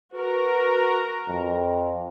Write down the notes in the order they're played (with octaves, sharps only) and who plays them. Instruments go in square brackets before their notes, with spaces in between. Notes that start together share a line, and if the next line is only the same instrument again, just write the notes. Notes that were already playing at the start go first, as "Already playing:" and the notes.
[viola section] F#4 A#4 A#5 [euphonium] B4
[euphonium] F2